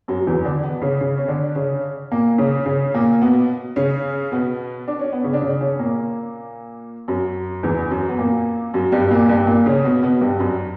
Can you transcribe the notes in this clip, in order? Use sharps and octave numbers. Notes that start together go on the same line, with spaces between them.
F#2 F#3
F#3
E2 E3
D3 D4
B2 B3
C#3 C#4
C#3 C#4
C#4
D3 D4
C#3 C#4
A#2 A#3
C#3 C#4
C#3 C#4
A#2 A#3
B2 B3
C#3 C#4
B2 B3
D4
C#4
B3
C#3 C#4
D4
C#3 C#4
C#3 C#4
A#2 A#3
F#2 F#3
E2 E3
F#2 F#3
B3
A#2 A#3
F#2 F#3
G2 G3
A#2 A#3
G2 G3
A#2 A#3
C#3 C#4
B2 B3
B2 B3
G2 G3
F#2 F#3